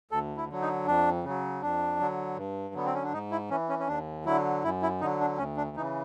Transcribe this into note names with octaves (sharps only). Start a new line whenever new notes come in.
D2 A4
E4
D3 F#3
D#4
F2 D4
C#3 F#3
F2 D4
D3 F#3
G2
D3 F#3 B3
C4
C#4
D4
G#2 D#4
E4
E3 C#4
C#4
C#4
D#2 D4
D3 F#3 E4
F#2 E4
E4
D3 F#3 D#4
D4
D2 C#4
D4
C#3 E3 D#4